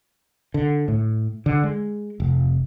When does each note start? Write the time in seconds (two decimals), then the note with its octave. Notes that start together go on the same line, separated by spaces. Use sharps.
0.54 D3
0.88 A2
1.46 D3
1.64 G#3
2.20 F1